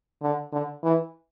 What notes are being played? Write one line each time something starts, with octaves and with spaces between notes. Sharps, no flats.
D3
D3
E3